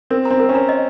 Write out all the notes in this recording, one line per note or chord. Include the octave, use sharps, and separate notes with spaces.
C4 A#4
A#5
C4
A#4
C#4
A#5
D#5